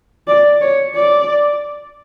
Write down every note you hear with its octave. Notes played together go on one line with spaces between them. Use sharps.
D5
C#5
D5